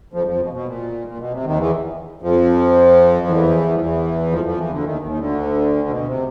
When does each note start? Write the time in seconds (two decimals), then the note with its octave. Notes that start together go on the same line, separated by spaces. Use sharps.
0.14 F2 F3
0.27 F2 F3
0.40 B2
0.53 B2
0.66 A#2
1.08 A#2
1.19 B2
1.32 C3
1.44 D#2 D#3
1.57 E2 E3
2.22 F2 F3
3.27 E2 E3
3.75 F3
3.79 E2 E3
4.31 F2 F3
4.44 F2 F3
4.58 E2 E3
4.70 D2 D3
4.83 D#2 D#3
5.01 D#2 D#3
5.11 D#3
5.19 D2 D3
5.88 B2
6.06 C3